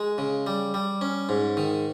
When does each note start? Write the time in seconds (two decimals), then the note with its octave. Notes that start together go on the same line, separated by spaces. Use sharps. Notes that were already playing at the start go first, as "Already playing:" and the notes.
Already playing: G#3
0.18 C#3
0.47 G3
0.74 G3
1.01 C#4
1.29 G#2
1.57 D#3